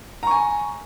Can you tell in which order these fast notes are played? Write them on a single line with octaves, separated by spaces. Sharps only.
A#5 C#6 G#5